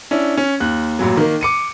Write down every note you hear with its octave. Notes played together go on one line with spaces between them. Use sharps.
C#4 D4 E4
C#4
D#2 F#6
A1 A#2 F#3
D#3 A#3
D6 C#7 D#7